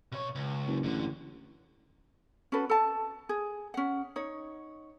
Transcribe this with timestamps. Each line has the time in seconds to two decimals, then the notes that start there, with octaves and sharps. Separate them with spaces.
0.12 B2 C#5
0.35 C#2
0.67 F#1
0.84 A1 F#2 D3
2.52 C#4 F#4 A4 B4
2.69 A4 A5
3.29 G#4
3.74 C#4 F#5
4.16 D#4 C#5